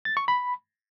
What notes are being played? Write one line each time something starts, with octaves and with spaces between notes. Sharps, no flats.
A6
C#6
B5